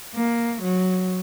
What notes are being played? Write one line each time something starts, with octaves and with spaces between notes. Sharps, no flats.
A#3
F#3